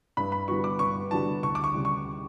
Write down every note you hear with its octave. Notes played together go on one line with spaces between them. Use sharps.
G2 B5
B5
D3 G3 B3 F#4 C#6
D6
G2 C#6
D3 G3 B3 F#4 A5
D2 C#6
D6
C#6
C#3 G3
C#6